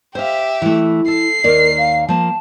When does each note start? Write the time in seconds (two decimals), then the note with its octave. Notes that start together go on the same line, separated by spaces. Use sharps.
0.15 G4 C5 E5 F5
0.62 E3 A3 E4
1.08 A4 C7
1.44 D#2 A#3 A#4 D5
1.78 F5
2.09 F3 A#3 A5